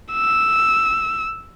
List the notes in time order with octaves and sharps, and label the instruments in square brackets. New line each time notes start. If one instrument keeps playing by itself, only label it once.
[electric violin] E6